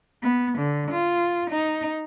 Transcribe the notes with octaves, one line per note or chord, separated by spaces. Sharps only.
B3
D3
F4
D#4